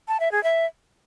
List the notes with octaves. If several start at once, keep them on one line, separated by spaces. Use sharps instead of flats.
A5
E5
G#4
E5